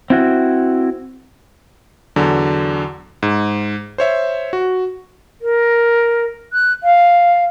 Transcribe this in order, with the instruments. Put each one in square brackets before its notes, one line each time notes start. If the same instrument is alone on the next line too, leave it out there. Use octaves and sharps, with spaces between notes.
[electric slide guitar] C4 E4 F#4
[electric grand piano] E2 D3 F#3
G#2
C5 C#5 E5
F#4
[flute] A#4
F#6
F5